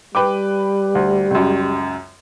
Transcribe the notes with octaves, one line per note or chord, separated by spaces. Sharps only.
G3 B4 G5 D6
D2
C#2 F#2